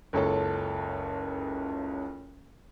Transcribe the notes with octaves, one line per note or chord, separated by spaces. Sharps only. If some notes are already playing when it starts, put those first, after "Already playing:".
F#1 C#2 A4 C#5 A5